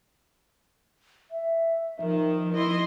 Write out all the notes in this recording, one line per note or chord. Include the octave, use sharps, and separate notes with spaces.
E5
D#3 F3
E4 D#5 C6